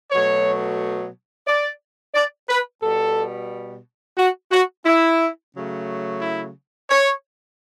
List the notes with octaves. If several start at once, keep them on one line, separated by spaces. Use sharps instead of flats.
B2 F#3 A3 C#5
D5
D5
B4
B2 G3 A4
F#4
F#4
E4
C#3 F#3 A3
E4
C#5